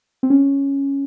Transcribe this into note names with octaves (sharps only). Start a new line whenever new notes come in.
C4
C#4